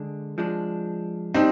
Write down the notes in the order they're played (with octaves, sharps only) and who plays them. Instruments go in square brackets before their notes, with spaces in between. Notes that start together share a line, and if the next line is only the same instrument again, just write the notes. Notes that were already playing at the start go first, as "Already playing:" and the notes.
Already playing: [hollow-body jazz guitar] D3 G#3 D4 G#4
F3 G#3 D4
[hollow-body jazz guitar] G3 D4 [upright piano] C4 D#4